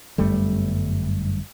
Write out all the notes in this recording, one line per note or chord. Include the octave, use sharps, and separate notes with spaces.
G1 F#2 G3 A3